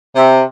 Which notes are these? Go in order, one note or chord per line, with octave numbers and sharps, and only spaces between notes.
C3